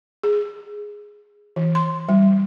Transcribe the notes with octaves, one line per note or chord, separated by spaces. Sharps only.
G#4
E3
C6
G3